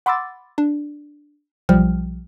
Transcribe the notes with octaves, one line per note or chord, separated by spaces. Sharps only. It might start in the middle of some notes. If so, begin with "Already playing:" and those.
F#5 B5 C6 D6 E6 A6
D4
B1 F3 G3 G5 F6